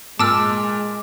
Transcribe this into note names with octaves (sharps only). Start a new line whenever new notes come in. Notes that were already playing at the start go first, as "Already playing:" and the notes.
A#2 G#3 A5 D6 E6 F6